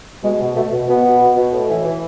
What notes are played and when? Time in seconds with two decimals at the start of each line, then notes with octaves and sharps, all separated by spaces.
0.23 B2 G#3
0.39 B2
0.55 B2 A3
0.71 B2
0.88 B2 B3
1.03 B2
1.20 B2
1.36 B2
1.52 A2
1.69 E3
1.84 E3